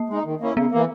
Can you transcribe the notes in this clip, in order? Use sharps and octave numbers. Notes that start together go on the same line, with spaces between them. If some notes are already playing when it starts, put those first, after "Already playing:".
Already playing: A#3
G#3 D#4
D#3
A#3 C#4 E4
C#3 B3
E3 A#3